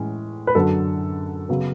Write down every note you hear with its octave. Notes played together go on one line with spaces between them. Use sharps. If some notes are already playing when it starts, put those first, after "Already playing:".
Already playing: A2 E3 G#3 C#4
B4
F#2 D3 F#3 A4
C#3 F#3 B3